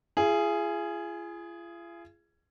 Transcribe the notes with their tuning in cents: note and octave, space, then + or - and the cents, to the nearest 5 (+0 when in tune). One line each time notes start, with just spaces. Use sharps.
F4 -45 G#4 +0